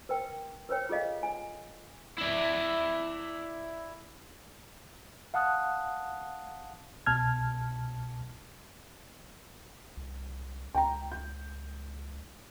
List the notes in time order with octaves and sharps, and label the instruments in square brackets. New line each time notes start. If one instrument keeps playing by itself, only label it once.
[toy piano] A#4 B4 G5
A#4 B4 C#5 G5
F4 G#4 A4 D#5 F5
G#5
[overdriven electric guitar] E4 D5
[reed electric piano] F5 F#5 A5 D#6 F#6
C2 B2 A5 F6 G#6
[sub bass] C2
[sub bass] C#2 [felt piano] G5 A#5
[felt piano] G6